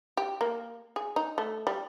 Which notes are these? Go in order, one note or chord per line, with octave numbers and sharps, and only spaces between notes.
G4
A#3
G#4
D#4
A3
G3